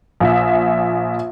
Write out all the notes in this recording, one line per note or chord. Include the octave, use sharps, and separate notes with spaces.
A#1 E5